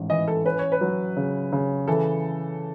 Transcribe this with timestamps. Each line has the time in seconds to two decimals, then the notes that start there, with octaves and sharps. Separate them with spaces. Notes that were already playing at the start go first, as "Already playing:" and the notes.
Already playing: A1 G#2
0.10 E3 D#5
0.28 A4
0.45 C#4 B4
0.59 C#5
0.72 B4
0.81 F#3
1.17 C#3
1.53 C#3
1.88 E3 A4